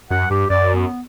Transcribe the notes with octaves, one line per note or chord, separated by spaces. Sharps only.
F#2 F#5
G2 G4
F#2 D5
B3